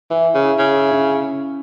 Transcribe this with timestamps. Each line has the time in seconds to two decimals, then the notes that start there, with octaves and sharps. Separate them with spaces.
0.10 E3 E4
0.34 C#3
0.42 E4
0.59 C#3 E4
0.75 E4
0.91 C#4